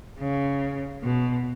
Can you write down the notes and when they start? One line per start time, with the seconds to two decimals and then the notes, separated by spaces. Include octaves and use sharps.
0.19 C#3
1.04 B2